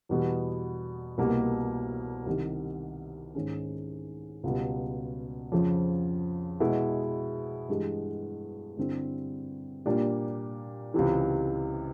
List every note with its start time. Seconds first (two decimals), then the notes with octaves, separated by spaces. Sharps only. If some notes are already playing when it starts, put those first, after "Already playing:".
0.09 E2 B2 G3 B3
1.18 C2 B2 G3 A#3
2.26 C2 C3 D#3
3.35 G#2 D#3 G#3 C#4
4.44 C#2 B2 G3
5.52 F2 C#3 F3
6.60 B2 G#3 B3 E4
7.69 G2 E3 G#3
8.77 G2 D3 G3 C4 E4
9.86 A#2 G3 A#3 D4 G4
10.94 C#2 C3 E3